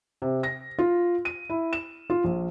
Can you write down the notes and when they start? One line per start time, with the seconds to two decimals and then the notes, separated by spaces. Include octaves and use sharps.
0.22 C3
0.43 A#6
0.78 F4
1.25 D#7
1.49 E4
1.73 E7
2.10 F4
2.24 A#1